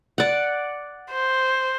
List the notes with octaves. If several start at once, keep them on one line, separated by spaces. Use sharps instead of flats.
D5 F#5
C5